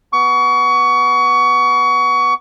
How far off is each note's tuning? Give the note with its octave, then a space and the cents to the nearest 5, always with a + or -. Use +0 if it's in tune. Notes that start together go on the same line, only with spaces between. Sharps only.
B3 +0 C#6 +25